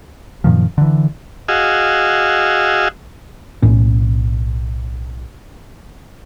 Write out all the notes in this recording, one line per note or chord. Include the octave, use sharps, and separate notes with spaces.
F#2 A#2 D#3 F3
D3 E3
F#4 G#4 D#5 F5 E6
B1 A2 C#4